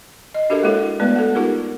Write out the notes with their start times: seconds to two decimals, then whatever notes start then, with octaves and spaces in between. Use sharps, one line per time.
0.34 D#5
0.50 D4 F#4 G4 A4 A#4 E5
0.63 G#3 A#3 E4 F#4 A4 C#5
0.99 G#3 A3 B3 B4 D5
1.16 A4 F#5
1.35 D#4 F4 G4 A#4